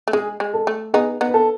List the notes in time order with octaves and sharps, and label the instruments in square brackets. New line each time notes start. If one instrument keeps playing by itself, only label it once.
[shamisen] A3
[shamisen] G#3 [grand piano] G#4
[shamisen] G#3
[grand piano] A4
[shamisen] A3
[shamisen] B3 D#4 [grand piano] G#4
[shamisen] B3 D#4
[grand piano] B4
A4